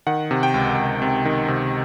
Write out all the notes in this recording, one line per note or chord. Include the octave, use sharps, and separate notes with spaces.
D#3 F#5
C3
G5
C#2
C#2
C3
D#3
C3